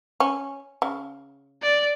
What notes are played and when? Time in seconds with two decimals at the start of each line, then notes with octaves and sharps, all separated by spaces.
0.20 C#4
0.82 C#3
1.62 D5